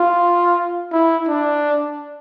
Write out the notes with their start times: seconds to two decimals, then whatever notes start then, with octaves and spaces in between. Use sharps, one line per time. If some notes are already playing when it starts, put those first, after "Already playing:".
Already playing: F4
0.93 E4
1.28 D4